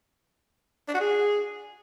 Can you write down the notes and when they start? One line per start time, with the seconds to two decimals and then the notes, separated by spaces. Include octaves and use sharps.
0.88 D4
0.94 F#4
1.00 G#4